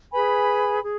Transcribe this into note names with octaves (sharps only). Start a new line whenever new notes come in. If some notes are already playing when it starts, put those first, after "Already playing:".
G#4 B4 G#5 B5
G#4